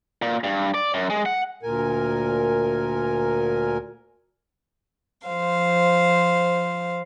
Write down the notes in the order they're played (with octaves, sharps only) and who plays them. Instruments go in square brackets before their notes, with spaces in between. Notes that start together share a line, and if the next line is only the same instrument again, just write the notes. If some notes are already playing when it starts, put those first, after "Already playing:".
[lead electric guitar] A#2
G2
D5
F#2
G#3
F#5
[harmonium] D2 A#2 A#4 G#5
[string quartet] F3 C5 F5